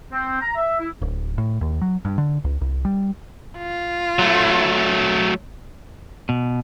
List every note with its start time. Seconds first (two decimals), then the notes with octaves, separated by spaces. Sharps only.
0.11 C4
0.41 A#5
0.56 E5
0.80 E4
1.02 D1
1.38 A2
1.61 D#2
1.81 F#3
2.05 G2
2.18 D3
2.44 C#2
2.61 C2
2.85 G3
3.58 F4
4.19 F#3 A3
6.29 B2